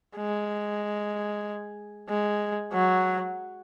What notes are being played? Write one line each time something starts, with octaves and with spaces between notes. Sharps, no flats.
G#3
G#3
F#3